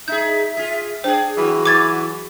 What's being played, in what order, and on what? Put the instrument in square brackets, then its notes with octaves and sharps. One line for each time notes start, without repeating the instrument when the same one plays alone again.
[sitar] D#4 G#4 [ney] E5 [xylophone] G6
[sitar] F4 G#4
[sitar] D4 G#4 [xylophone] C5 [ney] G5
[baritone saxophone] E3 [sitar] F#3 [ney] F#4
[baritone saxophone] E3 [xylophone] D6 G#6 A6